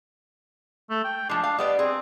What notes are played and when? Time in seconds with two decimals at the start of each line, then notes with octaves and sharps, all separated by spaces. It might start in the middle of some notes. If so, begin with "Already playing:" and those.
0.90 A3
1.04 G5
1.29 F3 G#3 D4
1.44 F5
1.59 G3 B3 D5 D#5
1.79 C4 G#4